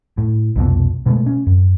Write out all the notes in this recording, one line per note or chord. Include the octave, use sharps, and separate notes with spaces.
A2
C2 F2 B2
B2 G#3 A3
C#4
F#2